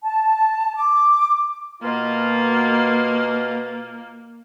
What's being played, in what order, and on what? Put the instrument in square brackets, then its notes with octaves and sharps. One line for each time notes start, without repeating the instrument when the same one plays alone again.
[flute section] A5
D6
[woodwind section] B2 F4 [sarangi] A#3